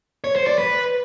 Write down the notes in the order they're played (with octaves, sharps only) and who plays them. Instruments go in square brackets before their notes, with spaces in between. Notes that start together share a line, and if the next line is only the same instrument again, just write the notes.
[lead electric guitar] C#5
C5
D5
B4